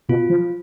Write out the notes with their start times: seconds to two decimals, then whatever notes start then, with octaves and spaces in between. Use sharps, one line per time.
0.09 B2 F4
0.30 F3